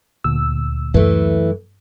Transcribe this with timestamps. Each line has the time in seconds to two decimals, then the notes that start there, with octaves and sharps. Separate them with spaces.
0.24 D2 A#2 E6
0.94 F#2 E3 A3